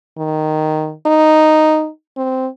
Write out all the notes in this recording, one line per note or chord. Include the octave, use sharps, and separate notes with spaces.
D#3
D#4
C4